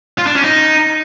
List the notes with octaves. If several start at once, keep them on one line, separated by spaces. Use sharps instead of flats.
F4
D4
C#4
D#4